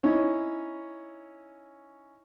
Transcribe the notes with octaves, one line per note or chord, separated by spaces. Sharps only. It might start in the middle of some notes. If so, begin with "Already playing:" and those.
C#4 D#4 E4 C#5